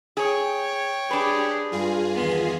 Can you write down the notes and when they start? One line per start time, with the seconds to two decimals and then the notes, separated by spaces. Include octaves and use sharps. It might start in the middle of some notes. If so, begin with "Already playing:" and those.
0.17 G#4 C#5 G5
1.11 D4 G4 G#4 B4
1.72 G2 F4 G#4
2.14 E2 D#3 B3 C6